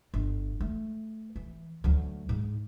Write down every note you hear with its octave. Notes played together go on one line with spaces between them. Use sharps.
G1
A3
E3
D2 F#3
G#2